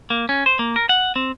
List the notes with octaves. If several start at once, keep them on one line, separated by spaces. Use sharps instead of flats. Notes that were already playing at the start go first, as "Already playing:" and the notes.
A#3
C#4
C5
A#3
A#4
F#5
C4